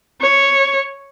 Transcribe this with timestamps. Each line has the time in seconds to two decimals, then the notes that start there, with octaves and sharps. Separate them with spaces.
0.21 C#5